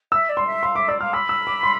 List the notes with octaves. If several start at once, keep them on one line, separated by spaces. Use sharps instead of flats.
E5 E6
D5
C6
E5
F5 C6
E5 D6
D5 E6
F5 F6
B5 E6
E6
D6
C6